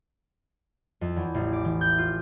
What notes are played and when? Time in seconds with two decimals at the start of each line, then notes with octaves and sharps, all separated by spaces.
1.01 F2
1.16 E2
1.34 A1
1.53 D6
1.65 E3
1.81 G6
1.98 F4